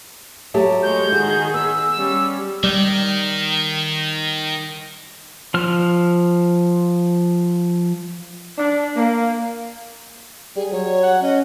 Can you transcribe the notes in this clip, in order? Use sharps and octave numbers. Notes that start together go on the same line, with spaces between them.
F#3 A3 G4
G#3 C#5 G6
D#3 F#4 G#4
B3 E6
G3 C#4
D#3 G3
F3 F6
D4
A#3
G3 G#4
F#3 C#5
F#5
C#4 D#5